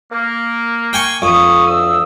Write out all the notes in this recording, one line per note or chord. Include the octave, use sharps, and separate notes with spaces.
A#3
G5 G#5 C#6
F2 C#6 D#6
D2 D#6 E6